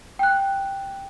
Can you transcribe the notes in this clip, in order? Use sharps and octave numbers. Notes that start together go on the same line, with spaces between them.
G5 F#6